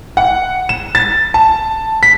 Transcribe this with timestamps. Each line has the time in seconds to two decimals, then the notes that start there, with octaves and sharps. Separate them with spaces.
0.17 F#5
0.69 E7
0.95 A6
1.34 A5
2.03 B6